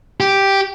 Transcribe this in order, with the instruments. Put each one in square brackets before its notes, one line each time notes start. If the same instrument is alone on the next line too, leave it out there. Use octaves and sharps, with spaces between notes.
[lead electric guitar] G4